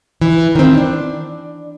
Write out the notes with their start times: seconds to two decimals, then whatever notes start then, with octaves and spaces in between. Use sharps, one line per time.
0.21 E3
0.55 D#3 C4
0.77 D4